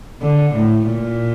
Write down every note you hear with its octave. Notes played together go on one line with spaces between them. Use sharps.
D3
A2
A#2